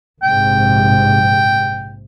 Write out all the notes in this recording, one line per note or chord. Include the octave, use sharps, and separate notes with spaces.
A#1 G#2 C3 G5